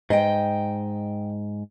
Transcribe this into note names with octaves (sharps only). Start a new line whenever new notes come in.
G#2 D#5 G5